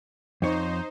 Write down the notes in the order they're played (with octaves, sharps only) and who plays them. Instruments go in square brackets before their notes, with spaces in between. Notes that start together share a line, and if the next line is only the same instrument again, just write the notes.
[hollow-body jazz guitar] F2 C#5 [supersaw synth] D#4 C5